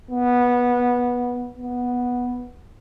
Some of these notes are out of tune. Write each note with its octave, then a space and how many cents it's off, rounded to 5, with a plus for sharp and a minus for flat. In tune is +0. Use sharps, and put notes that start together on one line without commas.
B3 -15
B3 -5